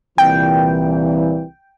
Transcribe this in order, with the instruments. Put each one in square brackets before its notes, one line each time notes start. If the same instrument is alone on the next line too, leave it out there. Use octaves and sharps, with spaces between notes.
[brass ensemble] C2 A#2 E3 [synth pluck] G5